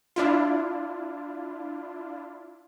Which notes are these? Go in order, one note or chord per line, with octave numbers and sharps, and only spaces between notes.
D4 E4 F4